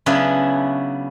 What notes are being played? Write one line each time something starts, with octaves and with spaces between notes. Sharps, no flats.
C#3 F#3 B3 C#4 D4 E4